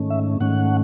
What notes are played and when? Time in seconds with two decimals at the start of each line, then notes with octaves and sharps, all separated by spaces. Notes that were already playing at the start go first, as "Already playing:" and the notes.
Already playing: G#2 D#3 A3 C#4
0.10 E5
0.40 G#2 D#3 A3 C#4 F#5